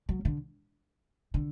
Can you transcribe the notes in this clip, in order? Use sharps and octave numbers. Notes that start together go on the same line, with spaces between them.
F#3
D3
D3